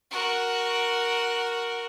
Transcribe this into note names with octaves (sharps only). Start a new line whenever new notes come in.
F#4 A#4